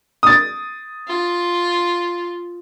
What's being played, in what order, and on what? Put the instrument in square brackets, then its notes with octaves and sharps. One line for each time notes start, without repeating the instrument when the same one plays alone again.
[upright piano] D#6 A6
[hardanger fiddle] F4